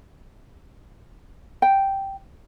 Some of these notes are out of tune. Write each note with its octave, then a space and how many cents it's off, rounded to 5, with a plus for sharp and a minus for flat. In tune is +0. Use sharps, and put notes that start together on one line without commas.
G5 -5